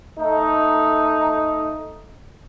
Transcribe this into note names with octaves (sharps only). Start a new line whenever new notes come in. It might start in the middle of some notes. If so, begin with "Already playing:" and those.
A3 D#4